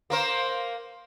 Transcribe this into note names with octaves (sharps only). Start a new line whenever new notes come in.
A#3 A#4 C5